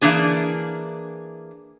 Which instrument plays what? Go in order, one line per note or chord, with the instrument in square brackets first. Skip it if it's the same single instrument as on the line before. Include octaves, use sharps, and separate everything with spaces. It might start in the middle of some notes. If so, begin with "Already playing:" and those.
[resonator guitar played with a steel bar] E3 A#3 D4 G#4